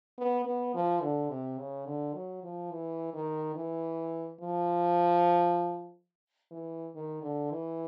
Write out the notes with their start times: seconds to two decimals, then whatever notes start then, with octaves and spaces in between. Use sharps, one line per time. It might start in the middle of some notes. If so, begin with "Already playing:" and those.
0.18 B3
0.45 B3
0.74 F3
1.02 D3
1.30 C3
1.58 C#3
1.86 D3
2.14 F#3
2.44 F3
2.71 E3
3.14 D#3
3.56 E3
4.41 F3
6.52 E3
6.95 D#3
7.22 D3
7.51 E3